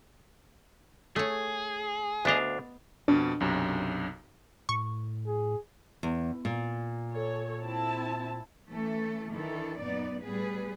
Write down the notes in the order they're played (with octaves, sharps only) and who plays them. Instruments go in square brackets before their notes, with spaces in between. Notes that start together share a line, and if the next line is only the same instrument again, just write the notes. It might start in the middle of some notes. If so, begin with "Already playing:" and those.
[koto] A3 C#5 [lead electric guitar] G#4
[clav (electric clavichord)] D2 D4 F5 [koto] B3 D#5
[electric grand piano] F2 B2 [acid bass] D4
[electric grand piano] B1 F#2 C3
[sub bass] A2 [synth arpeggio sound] C#6
[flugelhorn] G#4
[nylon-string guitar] E2
A#2
[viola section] A4 C#5
C4 E4 A5
[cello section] E3 A3 C#4 A4
D#3 E3 D4 E4 A4
F#2 A#2 B3 D#4 D5
A2 G3 B3 G#4 B4